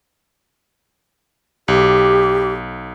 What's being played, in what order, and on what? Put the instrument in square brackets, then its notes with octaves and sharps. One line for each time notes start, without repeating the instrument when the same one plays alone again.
[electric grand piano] B1 [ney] G4